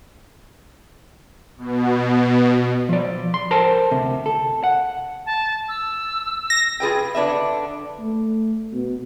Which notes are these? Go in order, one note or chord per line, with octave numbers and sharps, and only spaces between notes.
B2
F3 D5
C6
A4 A#4 C5 G5 A5
D2 C3
A4
F#5
A5
E6
A#6
F4 G#4 B4 G5
D3 D4 B4 E5
A3
B2